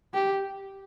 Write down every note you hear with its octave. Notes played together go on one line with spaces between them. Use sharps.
G4